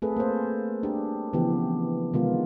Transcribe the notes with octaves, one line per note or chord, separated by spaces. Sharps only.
A3 C4 G#4 A4 B4
A#3 C5
D4 G4
C#3 E3 F3 B3 G4
C3 D#3 G#3 B3 F4